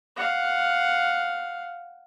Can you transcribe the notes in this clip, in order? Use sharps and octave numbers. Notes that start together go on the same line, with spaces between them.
F5 F#5